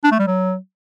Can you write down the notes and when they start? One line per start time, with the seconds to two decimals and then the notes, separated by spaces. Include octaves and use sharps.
0.04 D4
0.12 A3
0.19 G3
0.27 F#3